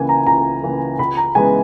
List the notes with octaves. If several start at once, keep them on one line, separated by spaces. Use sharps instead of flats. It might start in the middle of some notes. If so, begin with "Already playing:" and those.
Already playing: C#2 C#3 E3 A#3 G#5
A#5
C#2 A#5
C#3 E3 A#3
C#2 B5
A#5
C#3 E3 G#3 B3 G#5